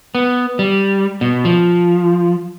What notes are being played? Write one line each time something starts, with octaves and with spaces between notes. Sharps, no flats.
B3
G3
B2
F3